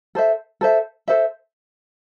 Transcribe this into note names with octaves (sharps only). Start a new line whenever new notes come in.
A4 C5 E5
A4 C5 E5
A4 C5 E5